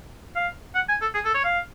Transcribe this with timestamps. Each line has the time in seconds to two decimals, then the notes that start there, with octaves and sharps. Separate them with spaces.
0.35 F5
0.75 F#5
0.89 G#5
1.01 A4
1.14 G#4
1.25 A4
1.34 C#5
1.44 F5